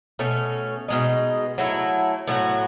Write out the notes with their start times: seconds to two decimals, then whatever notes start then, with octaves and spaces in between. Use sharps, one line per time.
0.19 B2 A3 C#4
0.88 B2 G#3 D#4
1.58 F#3 A3 E4
2.27 A2 F#3 B3 F#4